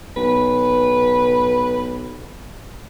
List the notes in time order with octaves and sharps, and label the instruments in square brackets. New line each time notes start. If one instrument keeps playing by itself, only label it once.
[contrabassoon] B1 [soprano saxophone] B4